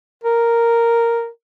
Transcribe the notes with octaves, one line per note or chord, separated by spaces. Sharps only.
A#4